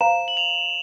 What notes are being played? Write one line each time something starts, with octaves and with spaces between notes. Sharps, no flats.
C5 F5 A#5 E7
F#7
F7